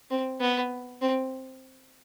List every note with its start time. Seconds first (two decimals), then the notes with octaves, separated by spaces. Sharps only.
0.10 C4
0.40 B3
1.01 C4